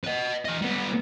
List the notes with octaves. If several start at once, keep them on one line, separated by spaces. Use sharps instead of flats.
B4 D#5
E3 D#5
G3 B3